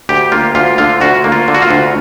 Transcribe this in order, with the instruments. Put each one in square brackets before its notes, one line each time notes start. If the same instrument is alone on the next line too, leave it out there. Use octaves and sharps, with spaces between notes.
[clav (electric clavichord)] D2 G4
A#3 F4
D2 F4
D3 F4
D2 F#4
A#3
F4
D3
F#4
F4
D2